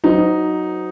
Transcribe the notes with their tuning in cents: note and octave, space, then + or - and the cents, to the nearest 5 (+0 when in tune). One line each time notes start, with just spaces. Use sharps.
F#3 +0 D#4 +0 C5 -35